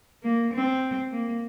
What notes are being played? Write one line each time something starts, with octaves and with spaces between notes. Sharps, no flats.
A#3
C4
A#3